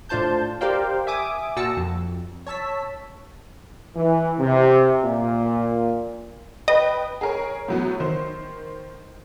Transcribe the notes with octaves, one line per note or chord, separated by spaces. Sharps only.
A2 D4 F4 C5 A5 G6
G4 A#4 C5 D5 F5 G5
E5 G#5 D6 D#6
A#2 F#4 A5 E6 A#6 C#7
F2
C#5 A5 E6 B6
E3
C3
A#2
B4 D#5 G5
G#4 A#4 C#5
A2 F#3 B3
D#3 C5